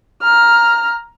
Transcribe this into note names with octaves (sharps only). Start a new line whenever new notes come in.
A#5 F6